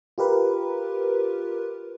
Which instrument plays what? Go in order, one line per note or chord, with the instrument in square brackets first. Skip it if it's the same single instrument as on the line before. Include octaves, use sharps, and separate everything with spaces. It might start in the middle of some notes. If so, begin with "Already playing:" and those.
[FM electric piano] F4 G4 A#4 B4